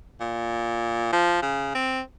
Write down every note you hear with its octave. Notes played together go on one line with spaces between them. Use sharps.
A#2
F3
C#3
C4